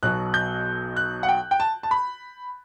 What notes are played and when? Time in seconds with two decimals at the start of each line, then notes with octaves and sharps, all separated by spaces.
0.03 B1 B2 F#3 F#6
0.34 G6
0.97 F#6
1.23 F#5
1.29 G5
1.51 G5
1.60 A5
1.83 A5
1.91 B5